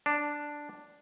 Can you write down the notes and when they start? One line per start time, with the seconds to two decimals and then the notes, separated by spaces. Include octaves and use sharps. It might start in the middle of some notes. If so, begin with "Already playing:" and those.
0.06 D4